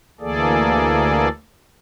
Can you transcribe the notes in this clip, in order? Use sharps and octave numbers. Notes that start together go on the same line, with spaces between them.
D2 E3 A#3 G#4 A4 D5